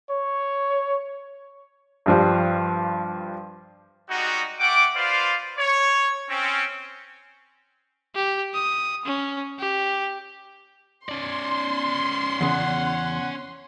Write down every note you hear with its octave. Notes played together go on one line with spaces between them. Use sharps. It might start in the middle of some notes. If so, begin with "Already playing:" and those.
C#5
G2 F3 G3
G3 G#3 D#4 F#4
A3 F#5 G5 D6
F4 B4 C5 D5 F5
C#5
C4 C#4
G4
D#6
C#4
G4
C#4 D5 C6
E2 C#3 F#5